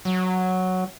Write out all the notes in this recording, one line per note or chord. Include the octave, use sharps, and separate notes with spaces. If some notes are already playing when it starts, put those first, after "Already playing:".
F#3